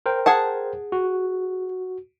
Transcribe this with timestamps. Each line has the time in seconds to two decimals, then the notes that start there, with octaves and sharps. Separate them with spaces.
0.06 A#4 C5 G5
0.26 G#4 F#5 A5
0.92 F#4